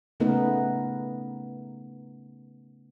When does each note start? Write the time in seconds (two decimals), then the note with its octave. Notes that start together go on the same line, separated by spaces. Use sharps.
0.20 C#3 A3 B3 D#4 A#4 B4